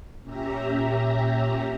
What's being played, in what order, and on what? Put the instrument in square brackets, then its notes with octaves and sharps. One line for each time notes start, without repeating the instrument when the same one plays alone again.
[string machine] A#2 C#4 G4 E5 A#5